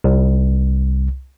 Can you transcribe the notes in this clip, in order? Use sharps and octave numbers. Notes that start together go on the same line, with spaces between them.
C2